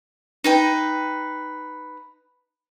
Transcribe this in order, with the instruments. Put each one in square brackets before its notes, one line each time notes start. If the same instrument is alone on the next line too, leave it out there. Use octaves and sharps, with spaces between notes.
[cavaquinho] D#4 B4 G5